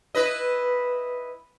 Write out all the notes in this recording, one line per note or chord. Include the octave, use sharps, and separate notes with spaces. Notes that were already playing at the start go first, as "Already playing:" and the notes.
E4 B4 D#5